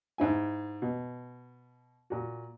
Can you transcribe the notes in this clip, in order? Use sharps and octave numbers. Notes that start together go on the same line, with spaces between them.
G#2 E4 G#5
B2
A#2 F#4